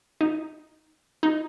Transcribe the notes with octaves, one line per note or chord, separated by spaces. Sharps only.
D#4
D#4